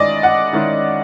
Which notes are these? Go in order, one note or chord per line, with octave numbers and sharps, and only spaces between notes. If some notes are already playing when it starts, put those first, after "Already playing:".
Already playing: D#3 G#3 C#4 E4 D5 D#5
F#5
D#3 G#3 C#4 E4